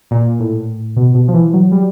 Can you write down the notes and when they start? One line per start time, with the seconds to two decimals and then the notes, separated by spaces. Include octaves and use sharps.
0.11 A#2
0.40 A2
0.96 B2
1.15 B2
1.28 F3
1.34 E3
1.53 F#3
1.72 G3